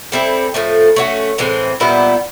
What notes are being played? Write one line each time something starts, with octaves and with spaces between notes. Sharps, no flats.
G3 C4 E4 A4
A2 F3 A3
A3 C#4 F#4
A2 E3 G#3 C4
A#2 G3 B3 E4